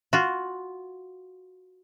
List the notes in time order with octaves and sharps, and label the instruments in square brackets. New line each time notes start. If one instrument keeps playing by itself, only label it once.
[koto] F4 F#4